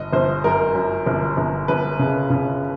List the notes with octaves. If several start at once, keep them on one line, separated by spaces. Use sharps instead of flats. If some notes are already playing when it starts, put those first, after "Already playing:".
Already playing: G1 D#5
G1 C5
F#2 A#4
F#2
G1
G1
G1 B4
C#3
C#3